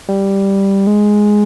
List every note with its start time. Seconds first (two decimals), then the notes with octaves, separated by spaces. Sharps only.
0.09 G3
0.87 G#3